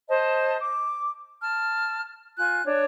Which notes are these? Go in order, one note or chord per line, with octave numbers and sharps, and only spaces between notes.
C5 D#5 A5
D6
A5 F6
F4 G#5 F#6
D4 C#5